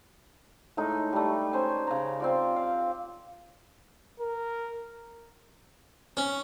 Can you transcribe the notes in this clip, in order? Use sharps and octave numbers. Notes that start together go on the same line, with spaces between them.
A2 G#3 D#4
G3 A3
C#4 C5 G#5
C#3 A#5
C4 F4 D5
F5
A#4
C#4